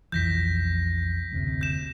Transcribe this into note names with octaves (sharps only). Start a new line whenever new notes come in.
B1 F2 E3 G6 A#6 B6
F#1 D2 C3
G6 E7